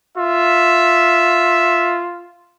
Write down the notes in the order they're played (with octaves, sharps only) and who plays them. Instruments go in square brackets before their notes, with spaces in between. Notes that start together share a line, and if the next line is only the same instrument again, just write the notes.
[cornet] F4 [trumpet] E5